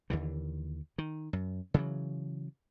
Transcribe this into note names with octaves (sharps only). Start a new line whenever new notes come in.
D#2 D3 E3
D#3
F#2
C#3 E3 F#3